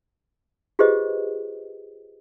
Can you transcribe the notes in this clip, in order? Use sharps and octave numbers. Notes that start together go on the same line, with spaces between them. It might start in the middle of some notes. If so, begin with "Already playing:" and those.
F4 G4 G#4 B4 C5 D#5